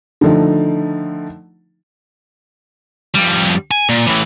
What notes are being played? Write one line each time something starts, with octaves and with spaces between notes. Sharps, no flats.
D3 D#3 F3 A3 D#4
F2 G3
G#5
A#2
A2 E3